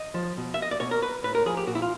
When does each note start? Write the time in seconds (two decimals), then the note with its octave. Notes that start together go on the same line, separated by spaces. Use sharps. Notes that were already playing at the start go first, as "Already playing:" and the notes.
Already playing: D#5
0.14 F3
0.37 B2
0.54 E5
0.62 D#5
0.71 D5
0.80 B2 C#5
0.91 A#4
1.03 B4
1.23 A2 B4
1.35 A#4
1.46 F3 G#4
1.57 G4
1.67 A#2 F#4
1.75 E4
1.82 F4